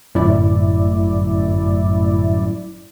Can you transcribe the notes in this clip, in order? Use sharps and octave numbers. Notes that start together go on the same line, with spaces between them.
G1 F#2 A2 E4 D5